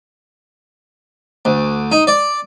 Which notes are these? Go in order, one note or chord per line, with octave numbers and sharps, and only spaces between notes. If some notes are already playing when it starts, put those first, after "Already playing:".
D2
D#4
D5